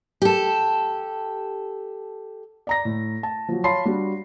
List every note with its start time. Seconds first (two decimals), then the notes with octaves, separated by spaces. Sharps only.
0.22 G4 A4
2.67 D5 A#5 A#6
2.85 A2
3.23 A5
3.49 F3 F#3
3.64 C#5 F5 A5 B5 C6 C7
3.85 G3 D4 F#4